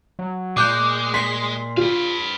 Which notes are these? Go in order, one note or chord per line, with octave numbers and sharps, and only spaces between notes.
F#3
A#2 G#3 D6 F#6 G6
C6 B6 C7
F4 B4 F5